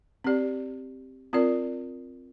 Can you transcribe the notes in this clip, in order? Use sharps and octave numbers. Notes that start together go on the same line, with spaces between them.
C4 G4 D5
C4 F4 A#4 D5